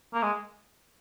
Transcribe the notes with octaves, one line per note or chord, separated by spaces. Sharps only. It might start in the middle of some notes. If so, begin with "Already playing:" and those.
A#3
G#3